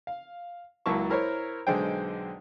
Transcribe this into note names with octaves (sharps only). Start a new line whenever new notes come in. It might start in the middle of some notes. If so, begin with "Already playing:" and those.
F5
C#2 F#3 A#3 E4 A5 C#6
E4 A#4 C5 C#5
B1 D3 G#3 C5 G5